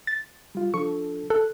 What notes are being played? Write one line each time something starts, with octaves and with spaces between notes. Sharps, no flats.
A6
G3 F4
F3 D4 A4 C#6
A4 F#6